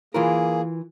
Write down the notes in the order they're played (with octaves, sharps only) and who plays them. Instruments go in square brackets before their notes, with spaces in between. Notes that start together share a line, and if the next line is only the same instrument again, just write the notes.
[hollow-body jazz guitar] E3 F4 A#4 [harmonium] A#3 G#4